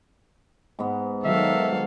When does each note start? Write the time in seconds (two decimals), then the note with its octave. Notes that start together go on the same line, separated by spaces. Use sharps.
0.79 G#2 B3
1.24 D#3 F#3 A4 E5 F5